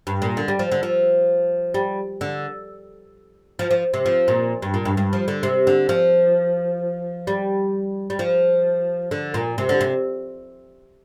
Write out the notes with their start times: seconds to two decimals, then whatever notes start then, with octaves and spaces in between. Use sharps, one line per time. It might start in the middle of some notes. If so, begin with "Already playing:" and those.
0.07 G2
0.22 A#2
0.37 D3
0.48 G3
0.59 F3
0.71 D3
0.83 F3
1.74 G3
2.21 D3
3.59 F3
3.71 F3
3.94 C3
4.06 F3
4.28 A#2
4.62 G2
4.74 A#2
4.85 G2
4.97 G2
5.13 F3
5.28 D3
5.43 C3
5.67 D3
5.89 F3
7.27 G3
8.10 G3
8.19 F3
9.11 D3
9.34 A#2
9.58 C3
9.69 D3
9.81 C3